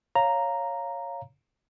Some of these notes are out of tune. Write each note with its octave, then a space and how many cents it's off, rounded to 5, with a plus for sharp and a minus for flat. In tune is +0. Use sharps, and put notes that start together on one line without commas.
C#5 +0 F5 +0 A#5 +0